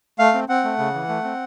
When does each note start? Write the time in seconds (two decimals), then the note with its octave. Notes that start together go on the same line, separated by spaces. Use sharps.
0.19 A3 F5
0.34 C4
0.49 C4 F#5
0.64 A3
0.79 C#3
0.94 E3
1.09 A3
1.24 C4